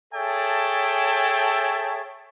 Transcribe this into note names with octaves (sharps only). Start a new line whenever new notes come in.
G#4 A4 C#5 E5 G5 A5